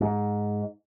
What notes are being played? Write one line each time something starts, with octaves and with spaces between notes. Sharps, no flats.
G#2